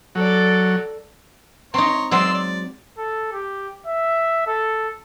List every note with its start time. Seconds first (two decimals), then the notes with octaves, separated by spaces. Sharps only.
0.15 F#3 A4 D5
1.74 C4 D#4 C#5 A#5 C6
2.11 F#3 G#3 C4 D5 C6 E6
2.34 D5
2.98 A4
3.33 G4
3.87 E5
4.47 A4